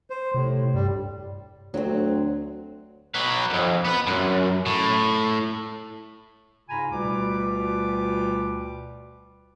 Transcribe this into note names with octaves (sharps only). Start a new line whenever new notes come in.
C5
A2 C3
G2 G3
D2 F#3 C4
F#3 B4
B1 F2
B3 B4
F#2
A2
G#2 C#3 F4 G#5 A#5 B5
D2 B2 G3 F4 B4 D6